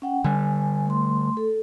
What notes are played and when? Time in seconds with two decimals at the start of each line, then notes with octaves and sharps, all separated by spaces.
0.02 C#4 F#5 G5
0.24 D3 G3 G#5
0.86 A3 C6
1.37 A4